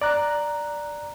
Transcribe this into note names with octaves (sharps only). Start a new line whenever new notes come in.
D5 A#5 F#6